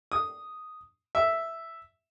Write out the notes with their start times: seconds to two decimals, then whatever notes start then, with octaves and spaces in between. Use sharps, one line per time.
0.12 D#6
1.15 E5